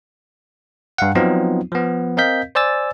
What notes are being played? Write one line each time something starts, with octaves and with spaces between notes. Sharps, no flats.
G2 F5 F#5
F3 F#3 B3 C4 D#4 F4
F3 B3
C4 A#4 D#5 F5 G6 B6
C5 D5 G#5 E6 A6